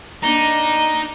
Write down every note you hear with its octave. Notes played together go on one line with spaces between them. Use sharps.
A#3 D4 D#4 A#5